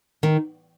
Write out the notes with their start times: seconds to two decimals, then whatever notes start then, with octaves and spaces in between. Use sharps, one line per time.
0.23 D#3